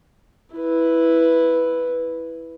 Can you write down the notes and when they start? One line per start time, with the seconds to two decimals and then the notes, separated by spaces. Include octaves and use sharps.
0.55 E4 B4